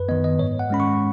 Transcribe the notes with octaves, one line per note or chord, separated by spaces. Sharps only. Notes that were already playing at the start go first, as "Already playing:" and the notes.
Already playing: F#2 B4
D#3 B3 D#5
D#5
G#2 C#5
F#5
G#3 C#4 B5
C#6